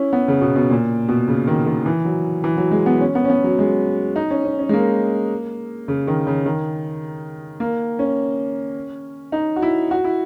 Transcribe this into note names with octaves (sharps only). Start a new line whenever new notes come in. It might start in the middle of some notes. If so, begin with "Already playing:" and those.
Already playing: C#4 E4
B3
C#3
B2
B2
A#2
B2
C#3
D#3
D#3
E3
F#3
E3
F#3
G#3
B3
C#4
B3
C#4
B3
F#3
G#3
D#4
C#4
C#4
C#4
G#3
A#3
C#3
D#3
C#3
D#3
A#3
C#4
D#4
F#4
E4
F#4
E4